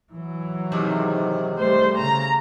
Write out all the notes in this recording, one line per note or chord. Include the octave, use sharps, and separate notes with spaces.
E3 F#3
G#2 C3 D#3
G3 A3 C5
C#3 A#5